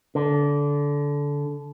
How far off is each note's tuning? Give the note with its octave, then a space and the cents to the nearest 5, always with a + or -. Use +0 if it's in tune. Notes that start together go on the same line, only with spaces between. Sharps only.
D3 -20